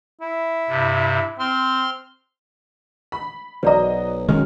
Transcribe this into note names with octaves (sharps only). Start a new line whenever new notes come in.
E4
G2 C3
C4 C6 F6
B5
B1 F#3 C5 D5 D#5 A#5
F#2 D#3 G#3 F6